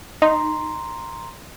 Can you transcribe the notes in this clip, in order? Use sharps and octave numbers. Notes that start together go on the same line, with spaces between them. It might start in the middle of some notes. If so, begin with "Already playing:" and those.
D#4 A#5 C6